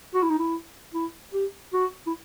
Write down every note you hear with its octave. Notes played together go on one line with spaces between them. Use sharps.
F#4
E4
D#4
E4
E4
G4
F#4
E4